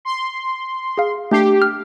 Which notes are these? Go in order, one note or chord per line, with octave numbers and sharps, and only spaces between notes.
C6
G#4 F5
A3 D4 G4 C7
F6